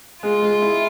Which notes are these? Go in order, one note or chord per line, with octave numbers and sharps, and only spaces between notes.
G#3 F4
G#3
E4